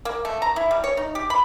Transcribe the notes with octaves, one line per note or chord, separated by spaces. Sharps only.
A#3
A3
A#5
E4
G3
C#5
D#4
G4
B5